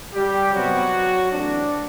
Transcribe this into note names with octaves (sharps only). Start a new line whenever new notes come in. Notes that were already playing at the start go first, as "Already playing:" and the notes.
G3 G4
C3 F#3 G3 B3 F#4
E3 A3 C4 D4